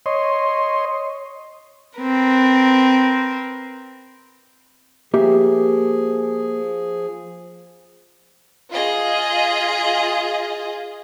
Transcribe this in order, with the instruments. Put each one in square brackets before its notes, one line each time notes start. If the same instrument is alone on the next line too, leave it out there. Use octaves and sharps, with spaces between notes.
[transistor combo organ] C#5 D#5 C6
[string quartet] C4 A#4 B4
[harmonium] F3 G#4 [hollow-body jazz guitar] A#3 G4 E5
[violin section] F4 G#4 D#5